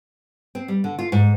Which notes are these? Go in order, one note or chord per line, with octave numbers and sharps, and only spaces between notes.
C4
G3
D3
F4
G#2